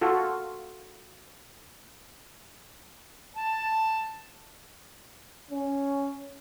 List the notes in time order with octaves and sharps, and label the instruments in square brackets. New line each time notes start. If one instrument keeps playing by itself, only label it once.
[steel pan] F4 F#4 A4
[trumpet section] A5
[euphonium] C#4